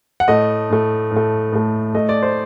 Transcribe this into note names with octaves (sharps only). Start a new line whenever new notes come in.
F#5
A2 A3 D#5
A2 A3
A2
A3
A2 A3
A2 A3 D#5
D5
C5